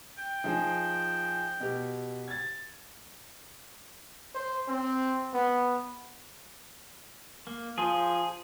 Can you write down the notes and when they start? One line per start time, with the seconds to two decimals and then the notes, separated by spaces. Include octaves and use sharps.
0.18 G5
0.44 F3 D#4 G#4
1.60 B2 G4
2.28 G#6 A6
4.35 C5
4.68 C4
5.34 B3
7.47 A#3
7.78 F3 G#4 C5